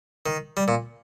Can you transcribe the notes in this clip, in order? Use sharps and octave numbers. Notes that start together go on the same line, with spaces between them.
D#3
G3
A#2